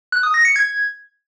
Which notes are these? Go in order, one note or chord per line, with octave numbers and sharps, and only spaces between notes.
F#6
D#6
A#6
C#7
G#6